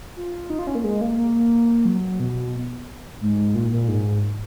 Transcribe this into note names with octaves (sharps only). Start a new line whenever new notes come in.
F4
D#4
F4
C#4
A#3
G#3
A#3
A#3
F#3
B2
G#2
A#2
A#2
G#2